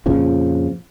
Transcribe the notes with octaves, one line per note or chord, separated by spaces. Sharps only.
F2 A#2 C#3 F3